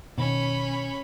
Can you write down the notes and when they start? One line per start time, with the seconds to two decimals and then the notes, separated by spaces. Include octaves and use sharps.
0.18 B2 D#3 C#4 B5